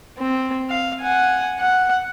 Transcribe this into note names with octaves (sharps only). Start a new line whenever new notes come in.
C4
F5
F#5 G#5
F#5